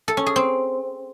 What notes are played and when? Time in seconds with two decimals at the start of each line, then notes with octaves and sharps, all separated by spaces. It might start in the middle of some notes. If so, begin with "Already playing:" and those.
0.08 A4
0.17 C#4
0.26 G#4
0.36 C4